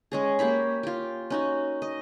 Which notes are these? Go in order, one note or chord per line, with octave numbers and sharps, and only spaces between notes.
G#3 C#4 G#4
A#3 G4 C#5 B5
F4 G4
C#4 D#4 F#4
D#5